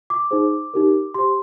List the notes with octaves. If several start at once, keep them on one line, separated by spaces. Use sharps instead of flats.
D6
D#4 G#4 C5
D#4 G4 A#4
G4 C5 C6